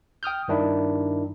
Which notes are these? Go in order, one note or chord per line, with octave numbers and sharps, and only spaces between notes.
G5 D#6 F6 G6
G2 D#3 D4 E4